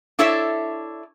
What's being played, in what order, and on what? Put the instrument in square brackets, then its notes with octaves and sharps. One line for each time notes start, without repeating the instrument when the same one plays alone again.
[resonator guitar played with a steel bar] D4 E4 A4 C#5 D5 E5